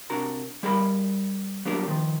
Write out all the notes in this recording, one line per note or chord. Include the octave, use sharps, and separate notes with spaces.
C3 D4 F#4 A#4 A#5
G3 G#4 A#4 B5
F#3 G3 A#3 B3 D4 A#4
D#3 F3